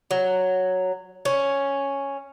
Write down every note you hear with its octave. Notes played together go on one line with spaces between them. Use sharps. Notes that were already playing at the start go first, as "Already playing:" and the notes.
F#3
C#4